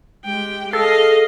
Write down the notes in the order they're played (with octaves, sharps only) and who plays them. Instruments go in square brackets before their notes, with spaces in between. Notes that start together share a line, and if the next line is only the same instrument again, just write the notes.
[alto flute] G#3 [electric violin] G4 G5
[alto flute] G#4 [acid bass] A4 [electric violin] D#5 F5